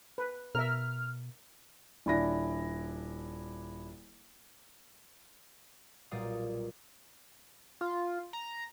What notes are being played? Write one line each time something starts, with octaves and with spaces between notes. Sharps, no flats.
B4
B2 A#4 E5 F6
D#1 D4 E4 D5 A#6
B1 A#2 G3 D5 F5 D#6
F4
A#5